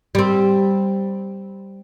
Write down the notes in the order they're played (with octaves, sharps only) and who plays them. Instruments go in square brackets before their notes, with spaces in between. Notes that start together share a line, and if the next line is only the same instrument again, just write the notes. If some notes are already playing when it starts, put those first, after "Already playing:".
[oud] G3 C4